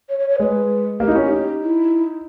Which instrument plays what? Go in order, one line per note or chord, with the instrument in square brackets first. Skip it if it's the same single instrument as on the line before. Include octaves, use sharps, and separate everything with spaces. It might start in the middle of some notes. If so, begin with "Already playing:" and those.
[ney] C#5
C#5
C#5
[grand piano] G#3 [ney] B4
[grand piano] A#3 [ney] G4
[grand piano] D#4
[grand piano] C#4 [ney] E4
[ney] G4
[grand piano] D#4
[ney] E4